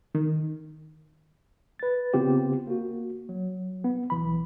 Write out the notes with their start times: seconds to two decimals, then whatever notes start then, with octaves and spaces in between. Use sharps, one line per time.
0.15 D#3
1.79 B4 A6
2.14 C#3 B3 C4 F4 G4
2.67 A#3 F#4
3.29 F#3
3.84 B3
4.10 B1 E3 B5